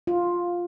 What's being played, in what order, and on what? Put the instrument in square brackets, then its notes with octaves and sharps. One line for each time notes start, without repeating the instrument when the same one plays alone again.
[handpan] F4